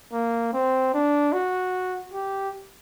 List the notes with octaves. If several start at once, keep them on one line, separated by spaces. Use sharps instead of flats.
A#3
C4
D4
F#4
G4